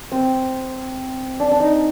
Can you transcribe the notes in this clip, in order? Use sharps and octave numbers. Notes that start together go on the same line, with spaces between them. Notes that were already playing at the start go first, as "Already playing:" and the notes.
C4
D4
D4
D#4